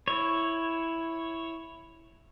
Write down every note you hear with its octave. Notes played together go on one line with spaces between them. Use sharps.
E4 C#5